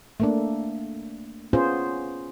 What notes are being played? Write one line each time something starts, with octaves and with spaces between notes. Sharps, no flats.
A3 A#3 D4
B3 C#4 F4 G#4 C5